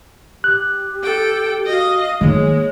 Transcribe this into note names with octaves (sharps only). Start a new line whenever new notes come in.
G4 F#6
A4 G5
F#4 D#5 F5
D#3 G#3 A#3 C#5